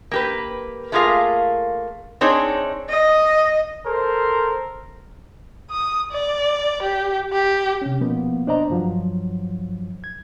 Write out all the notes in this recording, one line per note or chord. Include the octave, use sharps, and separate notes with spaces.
A#3 G4 B4
A3 A#3 F4 G#4 A#4 F5
C4 D4 D#4 G#4 C#5
D#5
A4 A#4 C5
D#6
D5
G4
G4
C3 C#4
B2 F3 A#3 B3
D4 C5 D5 D#5 A#5
G2 F3 F#3
G#6